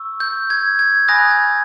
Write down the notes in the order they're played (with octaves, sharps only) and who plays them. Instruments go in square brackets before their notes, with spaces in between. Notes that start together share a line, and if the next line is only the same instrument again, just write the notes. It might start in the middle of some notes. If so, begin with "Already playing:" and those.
Already playing: [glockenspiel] C#6 E6
G6
G#6
G#6
G#5 B5 D#6 F#6 A#6
G#6